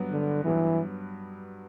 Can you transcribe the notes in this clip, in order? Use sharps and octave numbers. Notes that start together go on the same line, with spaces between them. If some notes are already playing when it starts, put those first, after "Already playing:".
Already playing: G2 F#3 B3
D3
G2 E3 F#3 B3